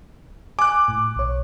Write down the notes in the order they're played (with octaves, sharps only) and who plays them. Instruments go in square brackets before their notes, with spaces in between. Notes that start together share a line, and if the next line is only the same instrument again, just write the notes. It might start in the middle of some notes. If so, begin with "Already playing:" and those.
[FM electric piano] G#5 [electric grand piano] D6 F#6
[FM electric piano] A2
B1 C#5